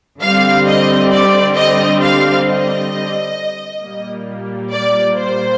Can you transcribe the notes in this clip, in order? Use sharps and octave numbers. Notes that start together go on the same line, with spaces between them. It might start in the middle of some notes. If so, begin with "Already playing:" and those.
D3 G3 C4 F5
D#5
D5
D#5
F5
D#5
A#2 G3 A#3
D5
C5